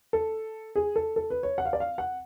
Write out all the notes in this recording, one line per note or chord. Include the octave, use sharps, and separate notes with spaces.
A4
G#4
A4
A4
B4
C#5
F#5
F5
D5
F5
F#5